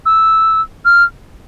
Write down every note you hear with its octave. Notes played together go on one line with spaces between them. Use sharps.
E6
F6